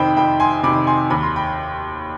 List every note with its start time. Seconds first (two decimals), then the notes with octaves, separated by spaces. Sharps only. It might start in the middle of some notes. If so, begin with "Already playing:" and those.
Already playing: F2 C3 D#3 C5 G5 B5
0.17 F2 G5 B5
0.40 G#5 C6
0.63 C3 B5 D6
0.68 D#3
0.87 G#5 C6
1.10 D#2 B5
1.23 C6
1.36 G5 B5